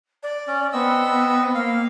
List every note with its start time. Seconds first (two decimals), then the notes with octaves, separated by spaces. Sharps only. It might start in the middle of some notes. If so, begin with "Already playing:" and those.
0.23 D5
0.47 C#4
0.73 B3 C4 D#5 E6
1.55 A#3 F5